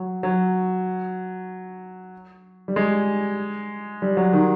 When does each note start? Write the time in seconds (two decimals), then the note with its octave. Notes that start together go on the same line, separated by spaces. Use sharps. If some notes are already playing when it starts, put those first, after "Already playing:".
Already playing: F#3
0.23 F#3
2.68 G3
2.76 G#3
4.02 G3
4.17 F#3
4.33 D#3